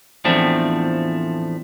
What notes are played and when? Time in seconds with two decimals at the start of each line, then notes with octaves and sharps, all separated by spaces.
0.25 E2 A2 F3 A3 C4 D4